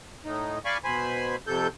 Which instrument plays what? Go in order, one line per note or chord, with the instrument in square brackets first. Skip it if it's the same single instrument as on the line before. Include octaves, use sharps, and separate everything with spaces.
[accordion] A2 D#4
D5 F5 G#5 B5 C#6
B2 C5 G#5 B5
F2 C3 A4 G6